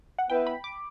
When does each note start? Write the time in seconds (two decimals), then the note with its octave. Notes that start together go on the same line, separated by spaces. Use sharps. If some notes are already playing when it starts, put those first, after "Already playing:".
0.18 F#5
0.29 B3 E4 B4 E5 G5
0.47 B5
0.64 D6